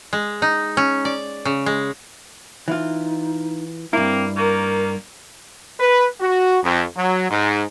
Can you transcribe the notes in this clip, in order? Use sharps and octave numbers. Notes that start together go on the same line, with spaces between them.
G#3
D#4
C#4
D5
C#3
G#3
E3 D#4 F4
G2 A#3 C4 E4
D#3 A#3 A#4
B4
F#4
F2
F#3
G#2